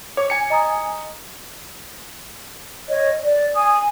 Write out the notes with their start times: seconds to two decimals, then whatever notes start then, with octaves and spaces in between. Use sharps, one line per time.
0.17 C#5 D6
0.30 G#5 C#7
0.50 D#5 A#5 D#6
2.89 C#5 D#5
3.23 D5
3.54 G#5 D#6